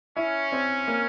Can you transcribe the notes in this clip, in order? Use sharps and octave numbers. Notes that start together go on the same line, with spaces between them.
C#4 E4
C4
A#3